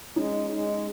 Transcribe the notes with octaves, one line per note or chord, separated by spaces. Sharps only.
G#3 C#4 D#4
G#3